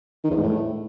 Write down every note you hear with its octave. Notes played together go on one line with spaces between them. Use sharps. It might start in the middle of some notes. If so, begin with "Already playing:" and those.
D#3
E2
G#2
A2